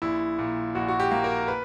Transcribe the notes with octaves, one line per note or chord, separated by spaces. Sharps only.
A#1 E4
A#2
A#1 F#4
F#4
G4
A#3
A#4
B4